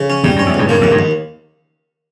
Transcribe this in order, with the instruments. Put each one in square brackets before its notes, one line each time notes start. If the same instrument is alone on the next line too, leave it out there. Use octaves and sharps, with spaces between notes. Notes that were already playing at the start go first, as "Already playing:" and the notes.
Already playing: [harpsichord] C#3
C#4
[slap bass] E2 G#2 [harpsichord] G3
[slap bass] G2
[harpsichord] C#4
[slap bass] E2
[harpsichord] C#2 [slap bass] G2
[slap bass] G2 [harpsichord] A#3
[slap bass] E2
[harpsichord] D#2
[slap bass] G2
[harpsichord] D#2